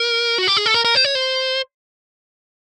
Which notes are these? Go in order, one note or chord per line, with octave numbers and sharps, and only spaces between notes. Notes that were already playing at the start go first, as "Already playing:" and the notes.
Already playing: A#4
F#4
G4
G#4
A4
A#4
A#4
C5
C#5
C5